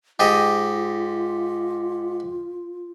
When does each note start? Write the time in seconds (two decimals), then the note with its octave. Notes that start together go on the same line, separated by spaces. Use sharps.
0.20 G#2 F4 G4 D#5